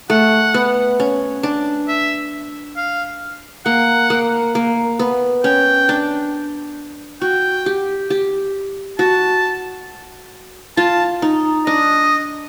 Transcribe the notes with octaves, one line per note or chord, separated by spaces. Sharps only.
A3 F#5
B3
C#4
D4
E5
F5
A#3 F#5
A#3
A#3
B3
C#4 G5
D4
F#4 G5
G4
G4
F#4 A5
F4 A5
D#4
D4 D#5